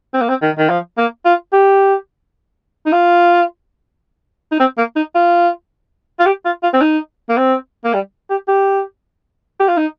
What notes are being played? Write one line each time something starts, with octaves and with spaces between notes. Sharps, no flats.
C4
A#3
C4
D#3
D#3
F3
A#3
F4
G4
D#4
F4
D#4
C4
A#3
D#4
F4
F4
G4
F4
F4
C4
D#4
A#3
C4
A#3
G3
G4
G4
G4
F4
D#4